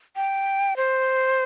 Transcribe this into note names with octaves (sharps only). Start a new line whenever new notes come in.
G5
C5